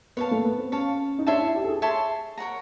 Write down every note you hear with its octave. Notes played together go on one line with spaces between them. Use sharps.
B3 C#5 F5 A5
A3
B3
C4
C#4 C#5 F5 A5
D#4
D4 C#5 E5 A5 C6
E4
G4
A4
G#4
C#5 E5 A5 C6
A#4 C#5 F#5 A#5